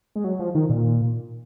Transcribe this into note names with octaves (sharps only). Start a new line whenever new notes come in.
G#3
F#3
F3
D#3
A#2